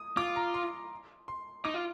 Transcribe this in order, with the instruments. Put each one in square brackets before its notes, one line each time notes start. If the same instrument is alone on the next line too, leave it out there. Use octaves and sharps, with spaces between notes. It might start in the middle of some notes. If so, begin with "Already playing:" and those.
Already playing: [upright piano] D#6
[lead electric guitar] F4 [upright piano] D6
[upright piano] A#5
C6
C6
[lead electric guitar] D#4 [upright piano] D6
[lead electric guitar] F4